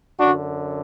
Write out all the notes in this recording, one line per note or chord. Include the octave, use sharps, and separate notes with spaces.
F#2 D3 D4 F#4